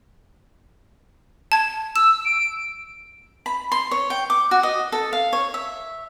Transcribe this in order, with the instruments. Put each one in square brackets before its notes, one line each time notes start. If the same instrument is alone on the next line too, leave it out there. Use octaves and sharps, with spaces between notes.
[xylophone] A5 G#6
[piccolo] E6 [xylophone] E7
[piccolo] D7
[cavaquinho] B5
C6
C#5
G5
D6
F#4
D#5
A4
F5
C#5
E5